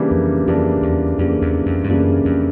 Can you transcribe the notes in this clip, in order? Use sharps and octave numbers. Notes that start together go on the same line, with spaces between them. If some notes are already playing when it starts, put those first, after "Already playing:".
Already playing: C#3 E3 G3 A#3 D4
F2
F2 C#3 E3 G3 A#3 D4
E2
F2 C#3 E3 G3 A#3 D4
E2
F2
G2
F#2 C#3 E3 G3 A#3 D4
F2